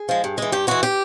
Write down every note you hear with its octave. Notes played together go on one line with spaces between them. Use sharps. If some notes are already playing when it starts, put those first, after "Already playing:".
Already playing: G#4
F3 G#3
G2
E3 G#3
G2 G4
E3 G#3 F#4
G4